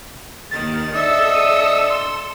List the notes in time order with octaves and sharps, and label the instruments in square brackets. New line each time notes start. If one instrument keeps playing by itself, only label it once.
[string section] D#2 D#3 [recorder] A6
[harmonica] D4 D#5 E5 [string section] A4 E6
[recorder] D#6
C6